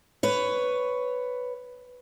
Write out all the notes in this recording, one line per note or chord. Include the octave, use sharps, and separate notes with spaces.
B4 C#5